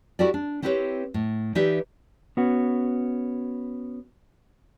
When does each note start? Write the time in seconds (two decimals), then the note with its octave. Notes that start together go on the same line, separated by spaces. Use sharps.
0.19 E4 F#4 G4 A4 D5
0.34 D4
0.62 B3 C4 E4 G4 B4 C#5
1.14 A2
1.55 E3 D#4 G4 B4 D5 E5
2.37 B3 C#4 F#4